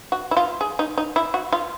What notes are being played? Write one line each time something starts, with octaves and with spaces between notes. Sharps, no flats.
F#4
E4
F4
G#4
D#4
D#4
E4
F#4
F4